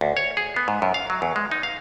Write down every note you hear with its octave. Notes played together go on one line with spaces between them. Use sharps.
D2
C#5
G#4
B3
G#2
F#2
F5
F#3
E2
G#3
D#4
F5